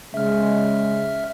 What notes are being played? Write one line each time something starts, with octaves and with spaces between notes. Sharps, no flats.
C#3 G#3 E5 F6